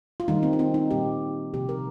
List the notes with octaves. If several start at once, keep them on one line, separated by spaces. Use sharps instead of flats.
F4
D#3 G3 A#3 D#4
C4
D#4
C4
D#4
A#2 G3 A#3 G4
C3 F3 A#3 G4
A#4